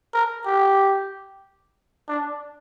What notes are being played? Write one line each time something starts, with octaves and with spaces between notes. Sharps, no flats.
A#4
G4
D4